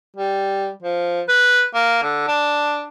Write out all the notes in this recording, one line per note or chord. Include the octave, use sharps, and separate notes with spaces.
G3
F3
B4
A#3
D3
D4